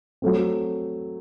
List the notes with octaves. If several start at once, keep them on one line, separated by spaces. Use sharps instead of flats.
F#3 A3 C4